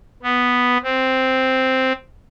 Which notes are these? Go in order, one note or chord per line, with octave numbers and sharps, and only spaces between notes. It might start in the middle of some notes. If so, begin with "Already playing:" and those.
B3
C4